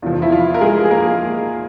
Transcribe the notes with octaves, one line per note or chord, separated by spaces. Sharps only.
E2 C3 F3 F4
E4
F4
A#4
G#3 G#4
G#4
A#3 A#4